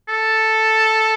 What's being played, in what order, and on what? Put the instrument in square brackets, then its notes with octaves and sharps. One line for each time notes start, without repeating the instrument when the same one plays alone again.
[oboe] A4